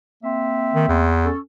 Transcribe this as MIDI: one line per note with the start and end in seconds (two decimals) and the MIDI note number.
0.23 1.12 58
0.23 1.12 60
0.23 1.12 76
0.74 0.88 51
0.88 1.29 40
1.24 1.38 61
1.24 1.38 69